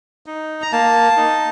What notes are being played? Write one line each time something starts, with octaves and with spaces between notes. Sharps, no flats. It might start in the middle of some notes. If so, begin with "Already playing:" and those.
D#4
A#5
A#3 A5
D#4